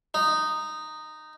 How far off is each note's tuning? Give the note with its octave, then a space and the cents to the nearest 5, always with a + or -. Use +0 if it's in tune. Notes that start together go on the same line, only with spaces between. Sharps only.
D#4 -10